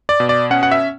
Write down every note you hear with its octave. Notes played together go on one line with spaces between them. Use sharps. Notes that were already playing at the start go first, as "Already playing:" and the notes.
D5
B2
D5
C#4 F#5
F#5
E5